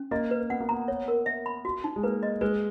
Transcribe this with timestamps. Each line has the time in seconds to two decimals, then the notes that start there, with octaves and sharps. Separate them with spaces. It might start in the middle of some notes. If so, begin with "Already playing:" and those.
Already playing: C#4
0.11 A#3 D#5
0.31 B4
0.50 B3 F#5
0.60 A#3
0.69 B3 A#5
0.88 C#5
1.08 A#4
1.26 E5
1.46 B5
1.65 F#4
1.84 D#4
1.96 G#3
2.03 A#3 B4
2.23 D#5
2.41 G#3 B4